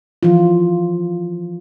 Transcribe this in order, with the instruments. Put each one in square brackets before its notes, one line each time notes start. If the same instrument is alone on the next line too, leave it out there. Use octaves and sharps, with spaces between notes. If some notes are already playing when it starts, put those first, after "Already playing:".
[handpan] E3 F3 F4